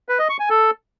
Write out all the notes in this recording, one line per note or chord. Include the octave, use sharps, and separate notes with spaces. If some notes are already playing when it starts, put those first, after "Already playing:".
B4
D#5
C#6
G#5
A4